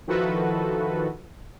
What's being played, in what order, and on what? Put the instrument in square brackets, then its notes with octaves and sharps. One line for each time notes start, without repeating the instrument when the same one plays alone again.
[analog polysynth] D#3 F3 E4 F#4 A4 B4